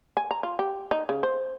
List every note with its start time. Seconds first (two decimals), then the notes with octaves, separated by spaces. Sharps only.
0.17 G#5
0.31 A#5
0.43 F4
0.59 G4
0.91 D#4
1.09 C#3
1.23 C5